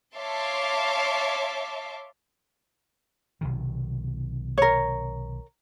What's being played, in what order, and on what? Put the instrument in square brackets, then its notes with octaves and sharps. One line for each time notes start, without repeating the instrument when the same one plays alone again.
[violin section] C#5 E5 F5 A5 C6 D6
[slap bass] B1 C3 D#3
[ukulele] A#4 C#5